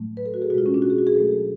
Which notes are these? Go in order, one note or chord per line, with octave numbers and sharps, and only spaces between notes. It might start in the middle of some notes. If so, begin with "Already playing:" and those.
Already playing: A2 F#3 A3
B4
A4
F#4
G#4
B2 G#3 F4 F#4
C#4
D4
F#4
G#4
F#4
G#4
B2 F#3 A3 A4